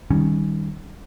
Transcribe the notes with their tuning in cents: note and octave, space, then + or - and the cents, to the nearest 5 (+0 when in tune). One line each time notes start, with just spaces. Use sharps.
D#3 +0 G3 +0 C#4 +0